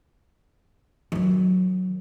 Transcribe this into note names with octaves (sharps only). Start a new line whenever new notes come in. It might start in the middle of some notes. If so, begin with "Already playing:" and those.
D#3 F#3